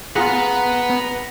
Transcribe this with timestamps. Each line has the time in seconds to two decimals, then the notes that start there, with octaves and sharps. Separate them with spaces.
0.16 F4 G#4 B4 F#5 A#5
0.90 B3